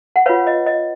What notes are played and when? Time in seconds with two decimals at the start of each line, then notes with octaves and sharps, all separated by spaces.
0.16 F#5
0.26 F4 B4 C#5 F5
0.47 D#5
0.66 D#5